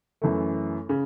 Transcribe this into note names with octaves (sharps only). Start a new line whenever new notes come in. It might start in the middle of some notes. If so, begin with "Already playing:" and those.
F#2 E3 A3
C#3